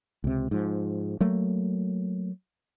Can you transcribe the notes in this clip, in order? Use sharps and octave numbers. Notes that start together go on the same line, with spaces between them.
C#2 C3
G#2 F3
F#3 A3 A#3